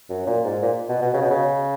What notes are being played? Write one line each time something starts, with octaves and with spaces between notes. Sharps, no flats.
F#2
A#2
G#2
A#2
B2
B2
C#3
B2
C#3